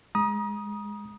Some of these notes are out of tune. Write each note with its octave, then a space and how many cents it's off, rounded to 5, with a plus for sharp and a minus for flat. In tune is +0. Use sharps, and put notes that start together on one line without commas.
G#3 +0 A#5 +40 D#6 +0